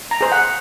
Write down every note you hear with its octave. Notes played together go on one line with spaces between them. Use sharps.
A#5
G#4 C5
F#5